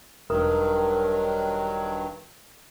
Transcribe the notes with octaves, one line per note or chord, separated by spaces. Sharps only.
E1 G2 D#3 F#3 A#4 D#6